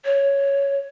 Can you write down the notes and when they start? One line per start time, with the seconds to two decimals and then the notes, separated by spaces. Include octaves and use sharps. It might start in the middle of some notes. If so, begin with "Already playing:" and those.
0.05 C#5